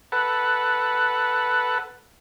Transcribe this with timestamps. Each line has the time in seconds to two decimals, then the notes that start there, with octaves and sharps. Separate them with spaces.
0.12 A4 B4 F#5